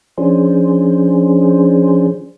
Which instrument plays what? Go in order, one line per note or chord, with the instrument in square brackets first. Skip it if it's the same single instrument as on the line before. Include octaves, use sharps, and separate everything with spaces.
[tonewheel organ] F3 C#4 D4 G#4 C5